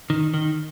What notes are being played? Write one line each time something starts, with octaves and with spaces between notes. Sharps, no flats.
D#3
D#3